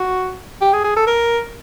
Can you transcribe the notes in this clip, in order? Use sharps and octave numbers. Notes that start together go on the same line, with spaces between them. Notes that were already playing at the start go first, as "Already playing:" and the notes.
Already playing: F#4
G4
G#4
G#4
A4
A#4